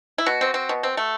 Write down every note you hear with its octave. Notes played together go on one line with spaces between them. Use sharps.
E4
B2 F#4
C4
C4
B2
C4
A3